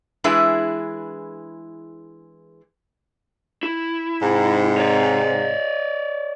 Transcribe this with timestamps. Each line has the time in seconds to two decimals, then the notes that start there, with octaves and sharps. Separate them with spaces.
0.24 E3 G#3 D4 E4 G#4 B4
3.63 E4
4.21 G#2 C3
4.78 C#5 D5